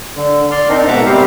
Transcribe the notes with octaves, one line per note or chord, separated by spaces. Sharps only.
D3
D5 C6 F6
C4 D4 D#4 A#4
G#2 B2 E5 F#5 A#5 D6
C3 G3 C4 G4 A#4 C5